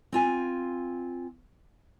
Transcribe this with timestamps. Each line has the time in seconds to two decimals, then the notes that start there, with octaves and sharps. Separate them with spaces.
0.12 C4 F4 G#5